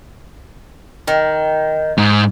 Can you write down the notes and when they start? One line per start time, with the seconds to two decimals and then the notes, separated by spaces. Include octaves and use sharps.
1.08 D#3
1.98 G#2